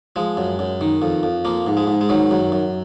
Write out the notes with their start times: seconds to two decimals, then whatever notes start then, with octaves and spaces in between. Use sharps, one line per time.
0.16 F3 G#3
0.37 F#2
0.59 F#2
0.81 D#3
1.02 F2
1.23 F2
1.45 F3 A#3
1.67 G#2
1.77 G#3
1.87 G#2
2.01 G#3
2.09 D#3 F#3
2.31 F#2
2.52 F#2